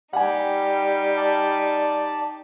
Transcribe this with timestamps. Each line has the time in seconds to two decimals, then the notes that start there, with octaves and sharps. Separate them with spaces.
0.13 G3 D#4 G4 F#5 G#5
1.17 D5 A5